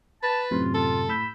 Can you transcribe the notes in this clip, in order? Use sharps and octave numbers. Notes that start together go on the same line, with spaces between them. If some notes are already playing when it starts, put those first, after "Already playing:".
B4 A5
F#2 A2 C3 F4
F4 A4
A2 B5 E6 G6